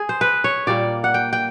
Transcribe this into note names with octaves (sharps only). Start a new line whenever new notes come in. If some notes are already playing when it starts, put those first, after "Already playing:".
Already playing: G#4
C5
B4
C#5
A#2 G3 A#3 D5
F#5
G5
G5